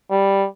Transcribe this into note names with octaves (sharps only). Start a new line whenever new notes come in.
G3